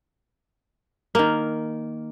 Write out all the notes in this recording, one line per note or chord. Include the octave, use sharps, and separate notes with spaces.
D#3 A#3